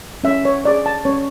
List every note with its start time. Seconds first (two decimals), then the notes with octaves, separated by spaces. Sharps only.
0.24 C#4 E5
0.45 C#5
0.64 G#4 C#5 D5
0.86 A5
1.05 C#4 C#5